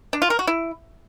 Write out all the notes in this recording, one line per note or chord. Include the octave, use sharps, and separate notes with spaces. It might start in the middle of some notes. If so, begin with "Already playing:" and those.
D4
F4
A#4
F#4
E4